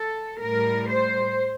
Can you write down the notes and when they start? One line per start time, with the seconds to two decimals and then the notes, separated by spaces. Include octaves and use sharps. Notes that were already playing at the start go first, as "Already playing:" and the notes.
Already playing: A4
0.40 A2 G3 A#4
0.90 C5